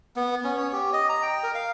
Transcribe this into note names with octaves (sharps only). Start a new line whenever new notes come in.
B3
C#4
C#5
G4
D#5
A#5
G5
A#4
F5